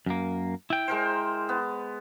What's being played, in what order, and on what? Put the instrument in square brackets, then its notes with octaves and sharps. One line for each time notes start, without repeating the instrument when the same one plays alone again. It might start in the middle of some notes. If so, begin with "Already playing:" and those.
[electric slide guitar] F#2 A#3
E4 G5
[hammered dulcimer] G#3 A#4 C5
B3